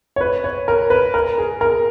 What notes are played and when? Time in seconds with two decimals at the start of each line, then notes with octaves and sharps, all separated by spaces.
0.16 C#5
0.21 B4
0.44 C#5
0.68 A#4
0.90 B4
1.14 A#4
1.38 G#4
1.61 A#4